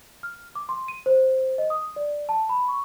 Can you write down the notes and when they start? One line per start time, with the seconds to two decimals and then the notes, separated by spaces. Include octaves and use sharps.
0.23 F6
0.55 D6
0.69 C6
0.88 D#7
1.06 C5
1.58 D#5
1.70 D#6
1.96 D5
2.29 A5
2.49 B5
2.68 C#6